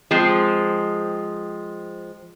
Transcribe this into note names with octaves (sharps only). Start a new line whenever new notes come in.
F3 G#3 C4